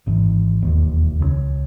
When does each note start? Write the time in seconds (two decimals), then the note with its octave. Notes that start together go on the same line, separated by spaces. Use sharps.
0.07 G#1 G#2 E3
0.62 E1 D#2 D#3
1.19 C#2 C#3 G#3 C#4